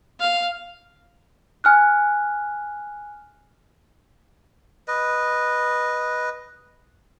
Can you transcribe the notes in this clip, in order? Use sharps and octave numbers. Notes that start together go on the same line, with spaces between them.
F5
G#5 F6 F#6
B4 D#5